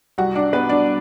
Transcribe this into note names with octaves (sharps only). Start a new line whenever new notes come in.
C2 F#4 F#5
D4 D5
B2 B3 B4
D4 D5